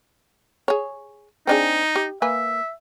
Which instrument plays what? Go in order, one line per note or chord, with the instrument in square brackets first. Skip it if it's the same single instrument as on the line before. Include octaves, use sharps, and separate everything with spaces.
[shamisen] G#4 C#5
[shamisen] C4 D4 G#4 [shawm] D#4
[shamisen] G4
[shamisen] A#3 B4 G#5 [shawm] E5